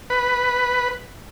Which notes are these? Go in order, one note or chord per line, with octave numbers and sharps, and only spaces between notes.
B4